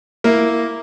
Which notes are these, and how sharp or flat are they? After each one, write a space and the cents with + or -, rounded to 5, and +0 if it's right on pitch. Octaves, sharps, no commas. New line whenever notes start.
A#3 +0 E4 +0 A#4 +0